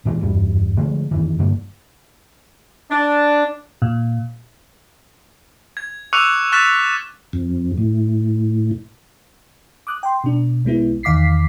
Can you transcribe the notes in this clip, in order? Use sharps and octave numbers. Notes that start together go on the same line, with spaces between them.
A#2 E3 F#3 G#3
F#1 E2 G2 G3
D3 F3 G#3 A3
F2 D#3 E3
G2 D3 A#3
D4
A#2
G#6
C#6 D6 E6 F#6 C#7 F7
C#6 F6 F#6 A6 B6 E7
F2
A2
D6 D#6 F#6
G5 C6
B2 D4
B1 G#3 B3 E4
E2 D#3 F5 D6 B6 C7